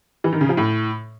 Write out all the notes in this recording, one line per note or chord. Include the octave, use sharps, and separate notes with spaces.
E3
D#3
C#3
F3
A2